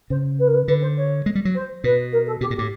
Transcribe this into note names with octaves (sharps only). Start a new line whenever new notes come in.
C#3 C5
B4
A#4
B4
D3 B4
C5
C#5
G#3
G3
F#3
C5
B2 B4
A#4
A4
B2 G4
A#2
G4
A2